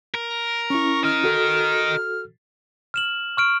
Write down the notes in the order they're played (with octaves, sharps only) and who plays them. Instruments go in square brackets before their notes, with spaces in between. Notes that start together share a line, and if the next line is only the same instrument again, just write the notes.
[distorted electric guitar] A#4
[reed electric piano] C#4 E4 [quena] C#6
[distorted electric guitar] A#4 D#5 [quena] F6
[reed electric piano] F#4 A4
[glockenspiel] F6 E7 F#7
C#6 F6 D7